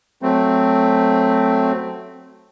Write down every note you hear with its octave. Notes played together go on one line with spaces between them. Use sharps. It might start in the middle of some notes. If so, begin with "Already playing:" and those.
F#3 A3 C4